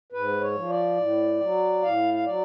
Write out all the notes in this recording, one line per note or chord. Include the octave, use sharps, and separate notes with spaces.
G#2 B4
C#5
F3
D5
A2
F#3
A2 F5
F5
F#3 D5